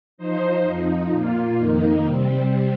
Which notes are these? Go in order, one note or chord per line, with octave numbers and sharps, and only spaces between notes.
F3 D#4 C5
F2 F3 D#4
A#2 A#3 F4
F2 D#3 A#3 D#4
C3 G3 C4